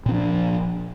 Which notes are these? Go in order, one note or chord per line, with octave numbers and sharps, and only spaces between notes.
A#2 F3 C4 D4